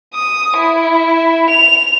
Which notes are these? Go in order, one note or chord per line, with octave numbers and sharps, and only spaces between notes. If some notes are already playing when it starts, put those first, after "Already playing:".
D#6
E4
F7